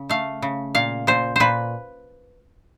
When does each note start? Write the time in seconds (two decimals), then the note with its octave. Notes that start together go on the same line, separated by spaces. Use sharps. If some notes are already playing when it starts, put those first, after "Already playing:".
Already playing: C#3
0.09 A3 F5
0.42 C#3
0.75 A#2 F5
1.07 A#2 C5
1.36 A#2 B4 C5